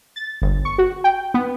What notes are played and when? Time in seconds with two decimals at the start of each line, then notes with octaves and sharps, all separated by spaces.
0.16 A6
0.42 G1
0.65 C#6
0.78 F#4
1.04 G5
1.34 B3